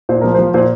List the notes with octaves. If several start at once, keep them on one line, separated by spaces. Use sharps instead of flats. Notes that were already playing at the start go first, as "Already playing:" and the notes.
A#2 C5
F3 A#4
F3 C5
A#2 C5